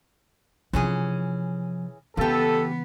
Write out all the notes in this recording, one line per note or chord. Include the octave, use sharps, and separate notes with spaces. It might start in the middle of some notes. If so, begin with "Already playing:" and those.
C3 E3 F3 C#4 G#4
C#3 E3 B3 F4 G4 A4